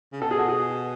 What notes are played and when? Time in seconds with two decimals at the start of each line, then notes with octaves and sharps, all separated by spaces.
0.13 C#3
0.21 B2 A4
0.31 G#4
0.39 F#4
0.48 G#4